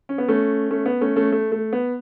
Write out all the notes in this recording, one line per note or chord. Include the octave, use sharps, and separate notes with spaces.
C#4
B3
A3 C#4
A3 C#4
B3
A3 C#4
A3 C#4
A3
A3
B3